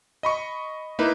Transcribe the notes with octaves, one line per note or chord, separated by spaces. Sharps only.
D#5 B5 C#6
A#3 D#4 E4 B4